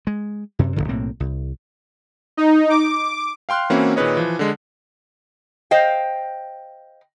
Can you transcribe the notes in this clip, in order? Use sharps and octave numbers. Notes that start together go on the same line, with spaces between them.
G#3
F#2 C3
D1 G2 D3
B1 A2 A#3 C4
C2
D#4
D6
F5 G5 C6 F6 F#6
E3 A#3 C4 C#4 E4 F#4
A#2 D#3 G#4 B4 C#5 D#5
E3 F3
D3 G#3
C5 D#5 F5 G5